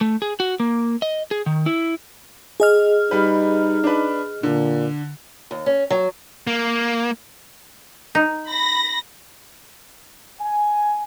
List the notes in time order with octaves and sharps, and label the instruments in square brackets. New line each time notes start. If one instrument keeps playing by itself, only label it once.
[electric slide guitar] A3
G#4
F#4
A#3
D#5
G#4
D#3
E4
[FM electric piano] G#4 D#5 F6
[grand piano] G3 B4 [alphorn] D#4
[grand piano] D4 B4
[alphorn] A#2 [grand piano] D3
[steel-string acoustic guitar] D#2
C#4
F#3
[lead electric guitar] A#3
[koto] D#4
[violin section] B5 A#6
[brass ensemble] G#5